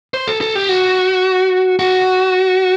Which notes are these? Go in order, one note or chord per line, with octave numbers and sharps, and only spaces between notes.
C5
A4
A4
G4
F#4
F#4